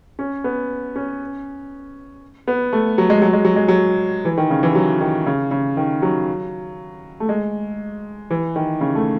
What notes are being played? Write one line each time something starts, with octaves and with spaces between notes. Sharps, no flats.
C#4
B3
C#4
B3
A3
F#3
G#3
F#3
G#3
F#3
G#3
F#3
E3
D#3
C#3
E3
F#3
D#3
C#3
C#3
D#3
F#3
A3
G#3
E3
D#3
C#3
A3